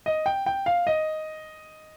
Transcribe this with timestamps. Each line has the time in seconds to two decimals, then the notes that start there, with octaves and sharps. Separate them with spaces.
0.06 D#5
0.26 G5
0.46 G5
0.66 F5
0.87 D#5